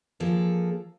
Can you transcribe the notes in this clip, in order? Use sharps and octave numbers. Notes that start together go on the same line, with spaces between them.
F3 A#3 G#4 A4